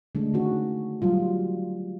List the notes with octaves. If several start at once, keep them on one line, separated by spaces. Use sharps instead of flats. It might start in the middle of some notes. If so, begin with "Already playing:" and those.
D3 G#3 A3 D4
D#3 C#4 F#4
F#3 G3 F4